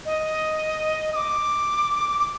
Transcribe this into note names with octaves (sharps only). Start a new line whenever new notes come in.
D#5
D#6
D6
D6